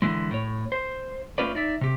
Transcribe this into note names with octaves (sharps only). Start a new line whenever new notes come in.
D3 E3 G#3
A2 C#5
C5
A3 C#4 F4 B4 D5
D#4 D5 E5
C3 G4